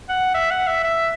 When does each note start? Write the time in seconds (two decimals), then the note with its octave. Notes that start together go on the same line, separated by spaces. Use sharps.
0.09 F#5
0.34 E5
0.51 F#5
0.67 E5
0.84 E5